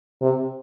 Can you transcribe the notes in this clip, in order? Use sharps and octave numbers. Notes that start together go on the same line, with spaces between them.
C3